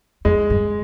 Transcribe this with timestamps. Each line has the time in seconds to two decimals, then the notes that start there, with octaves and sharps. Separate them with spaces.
0.25 F2 G#3
0.50 G2